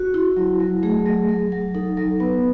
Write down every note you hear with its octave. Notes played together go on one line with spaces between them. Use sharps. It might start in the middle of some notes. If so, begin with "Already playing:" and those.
Already playing: F#4
E4
F#3
F#3
A3 G#4
F#3
F#3
F#3
D#4 A4
F#3
B3 B4